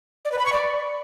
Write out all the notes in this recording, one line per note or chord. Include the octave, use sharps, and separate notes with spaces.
D5
B4
B5
C#6
D5